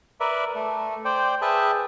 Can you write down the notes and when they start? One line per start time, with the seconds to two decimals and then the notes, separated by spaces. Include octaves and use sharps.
0.20 A#4 B4 D5 E5
0.55 A3
1.05 C5 D5 G5
1.42 G#4 B4 E5 G5 A5